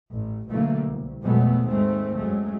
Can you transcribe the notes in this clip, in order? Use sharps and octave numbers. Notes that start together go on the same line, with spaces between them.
A1
B2 D3 E3 F#3 A3 A#3
C2
F2 B2 F#3 G#3 A3 B3
D#2 G#2 D#3 G#3 A3 C4
F#2 F#3 G#3 A3